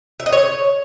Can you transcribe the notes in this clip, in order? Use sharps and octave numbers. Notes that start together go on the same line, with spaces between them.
E5
D#5
C#5